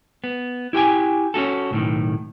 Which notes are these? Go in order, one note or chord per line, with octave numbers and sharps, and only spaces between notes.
B3
E4 G4 G5 G#5
C#4 D#4 F#4 A4
B1 A2 D#3